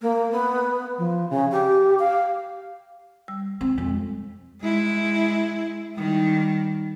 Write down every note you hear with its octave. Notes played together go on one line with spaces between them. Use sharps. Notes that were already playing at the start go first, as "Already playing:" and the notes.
A#3
B3
F3
C#3
G4
F5
G3 E6
C4
F2 G#3
G#3 E4
D#3 G3